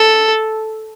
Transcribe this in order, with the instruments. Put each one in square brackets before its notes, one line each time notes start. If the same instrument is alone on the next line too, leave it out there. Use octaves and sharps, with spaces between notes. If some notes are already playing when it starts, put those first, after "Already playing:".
Already playing: [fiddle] A4